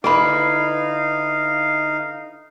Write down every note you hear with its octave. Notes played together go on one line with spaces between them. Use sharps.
D3 D#4 E4 G#4 B4 F5 B5